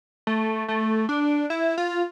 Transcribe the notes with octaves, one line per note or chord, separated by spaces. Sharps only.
A3
A3
D4
E4
F4